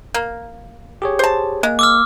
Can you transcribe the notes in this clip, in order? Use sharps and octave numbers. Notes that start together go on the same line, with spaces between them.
A#3
G4 G#4 C#5
C5 A5
G#3 A#3
D6 E6 F6